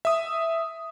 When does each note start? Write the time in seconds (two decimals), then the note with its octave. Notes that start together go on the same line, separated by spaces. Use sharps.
0.05 E5 D#6